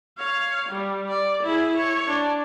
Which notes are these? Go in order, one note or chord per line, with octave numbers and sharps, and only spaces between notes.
C#5 F5
G3
D5
E4 G#4
C#5
D4